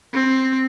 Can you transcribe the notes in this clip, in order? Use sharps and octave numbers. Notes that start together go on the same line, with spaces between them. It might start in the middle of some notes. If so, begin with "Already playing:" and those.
C4